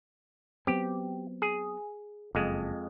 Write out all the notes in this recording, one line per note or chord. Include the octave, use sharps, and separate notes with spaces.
F#3 B3 C4 G4
G#4
F#1 F2 G#3